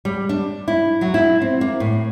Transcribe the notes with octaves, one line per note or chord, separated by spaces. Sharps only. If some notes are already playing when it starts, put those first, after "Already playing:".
G3
D4
E4
F#3
E4
C4
A#3
A2